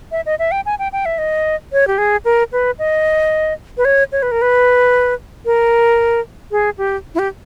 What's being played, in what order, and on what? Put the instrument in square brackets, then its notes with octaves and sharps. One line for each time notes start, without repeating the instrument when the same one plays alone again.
[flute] E5
D#5
E5
G5
G#5
G5
G5
E5
D#5
C#5
G4
G#4
A#4
B4
D#5
B4
C#5
C#5
B4
A#4
B4
A#4
G#4
G4
E4
G4